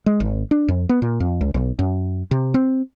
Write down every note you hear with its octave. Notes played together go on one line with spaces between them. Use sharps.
G#3
G#1
D4
F2
B3
A#2
F2
C#2
B1
F#2
C3
C4